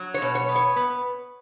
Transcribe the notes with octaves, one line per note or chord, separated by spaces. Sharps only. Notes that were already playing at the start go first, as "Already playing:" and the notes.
Already playing: F#3
C#5
B2
C#5
B3
C#5
B3